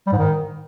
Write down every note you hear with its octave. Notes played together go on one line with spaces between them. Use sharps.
G3
G#2
D#3